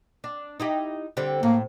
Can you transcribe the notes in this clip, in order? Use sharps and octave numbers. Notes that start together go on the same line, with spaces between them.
D4
D#4 E4 G4
D3 G3 C4
A2 A#3